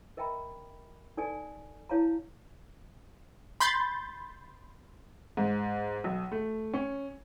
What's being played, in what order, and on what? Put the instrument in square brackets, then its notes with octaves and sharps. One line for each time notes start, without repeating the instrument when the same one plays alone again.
[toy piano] A#4 D#5 E5 G5 A#5 B5
D#4 A4 D5 G#5
E4 C#5 F5 A5 A#5
[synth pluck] B5 C6 G6 A6
[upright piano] G#2
B1
A3
C#4